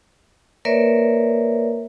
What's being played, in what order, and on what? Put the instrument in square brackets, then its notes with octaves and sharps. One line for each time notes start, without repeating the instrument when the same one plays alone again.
[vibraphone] A#3 A#4 B4 C#5 D5 E5